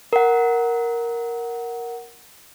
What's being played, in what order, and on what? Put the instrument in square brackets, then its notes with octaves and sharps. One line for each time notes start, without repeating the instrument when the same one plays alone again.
[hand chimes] A#4 F#5